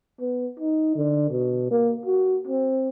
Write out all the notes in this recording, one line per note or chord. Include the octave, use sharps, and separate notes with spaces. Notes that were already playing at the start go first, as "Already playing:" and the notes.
B3
D#4
D3
B2
A#3
F#4
C4